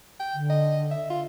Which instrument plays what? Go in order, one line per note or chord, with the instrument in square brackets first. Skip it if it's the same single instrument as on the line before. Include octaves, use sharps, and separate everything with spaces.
[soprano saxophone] G5
[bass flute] D3
[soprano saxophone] D#5
E5
F4